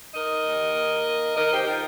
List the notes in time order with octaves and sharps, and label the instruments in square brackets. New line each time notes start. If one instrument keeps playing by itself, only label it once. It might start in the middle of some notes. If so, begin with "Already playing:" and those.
[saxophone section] D#4 A#4 D#5
D#2
A#3
D#3
D#3 A#4 D#5
G4 C5
D#4 F4 A#4